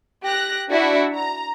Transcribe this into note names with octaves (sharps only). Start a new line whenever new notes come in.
G4 F#6 A#6
D4 E4 F#4 D5 E5
A#5